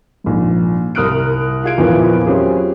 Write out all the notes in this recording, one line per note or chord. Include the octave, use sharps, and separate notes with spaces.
A#1 G#2
C2 A#4 D#6 F6 F#6 D7
F4 G#4 F5 G#6 D7
E2 A#2 E3 F3 A#3 B3
F#3 C4 C#4 F4 G4 G#4